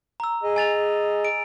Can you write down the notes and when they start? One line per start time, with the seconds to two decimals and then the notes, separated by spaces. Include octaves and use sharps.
0.20 A#5 E6
0.43 G#4 D#5
0.56 G#5 A6 F7
1.25 D7